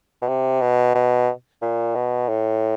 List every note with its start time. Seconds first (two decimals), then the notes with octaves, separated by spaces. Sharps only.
0.22 B2
0.28 C3
0.61 B2
0.95 B2
1.62 A#2
1.95 B2
2.29 A2